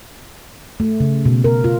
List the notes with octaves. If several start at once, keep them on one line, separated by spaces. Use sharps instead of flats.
A3
C#3
B2
A#4
F4